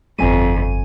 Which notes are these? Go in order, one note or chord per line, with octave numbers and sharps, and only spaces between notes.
G1 F2 G#5 D#7